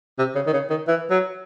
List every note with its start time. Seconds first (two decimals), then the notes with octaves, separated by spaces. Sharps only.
0.18 C3
0.35 C#3
0.47 D#3
0.53 C#3
0.70 D#3
0.88 E3
1.10 F#3